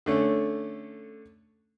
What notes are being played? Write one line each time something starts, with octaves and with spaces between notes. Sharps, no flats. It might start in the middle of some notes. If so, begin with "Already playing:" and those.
D3 A3 C#4